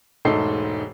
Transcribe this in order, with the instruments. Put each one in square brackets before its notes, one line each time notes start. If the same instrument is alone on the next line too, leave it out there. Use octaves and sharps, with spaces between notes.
[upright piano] E1 G#2 A3 A4 D#5 C7